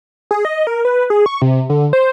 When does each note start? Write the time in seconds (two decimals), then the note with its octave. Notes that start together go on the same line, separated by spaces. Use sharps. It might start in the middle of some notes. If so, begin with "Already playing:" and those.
0.31 G#4
0.45 D#5
0.67 A#4
0.85 B4
1.10 G#4
1.26 C#6
1.42 C3
1.70 D3
1.93 C5